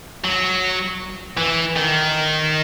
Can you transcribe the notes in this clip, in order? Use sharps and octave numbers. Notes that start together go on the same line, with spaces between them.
F#3
E3
D#3